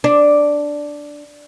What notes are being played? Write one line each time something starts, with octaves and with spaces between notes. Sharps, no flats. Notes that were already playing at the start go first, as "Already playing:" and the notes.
D4